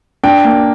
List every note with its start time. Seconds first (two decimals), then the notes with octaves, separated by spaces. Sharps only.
0.23 D4 G5
0.45 A#3